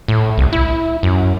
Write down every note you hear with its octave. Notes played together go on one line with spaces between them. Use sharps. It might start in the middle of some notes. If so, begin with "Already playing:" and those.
A2
C2
E4
F#2